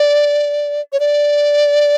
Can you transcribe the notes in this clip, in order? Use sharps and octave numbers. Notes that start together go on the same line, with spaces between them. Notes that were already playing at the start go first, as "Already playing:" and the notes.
Already playing: D5
C#5
D5